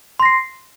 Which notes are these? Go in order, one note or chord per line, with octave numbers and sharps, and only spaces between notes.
C6 A#6 C7